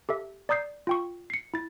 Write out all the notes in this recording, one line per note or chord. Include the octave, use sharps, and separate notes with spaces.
G4 A4 E5
D5 A#5 D#6 G6 C7
F4 G5 C#6
C7 C#7
E4 A6